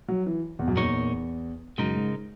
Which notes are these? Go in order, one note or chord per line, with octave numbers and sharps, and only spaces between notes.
F#3
E3
E2
F#2
E2 A#2 A#3 D#4 A#4 C#5
F#2 C#3 G#3 D#4 A#4
G#2